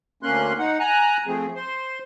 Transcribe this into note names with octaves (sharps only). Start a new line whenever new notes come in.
D2 A#3 C#4 C6 F#6
D#4 F#5
G#5 A#5 F#6
F3 A3 C4 G#4
C5 C6